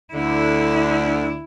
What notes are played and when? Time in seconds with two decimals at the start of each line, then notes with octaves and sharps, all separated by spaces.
0.14 D2 D3 E4